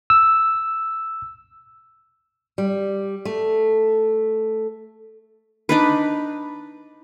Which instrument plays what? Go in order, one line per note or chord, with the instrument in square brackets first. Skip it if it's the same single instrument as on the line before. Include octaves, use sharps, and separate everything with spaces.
[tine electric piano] E6
[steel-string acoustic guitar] G3
A3
[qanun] D4 D#4 B4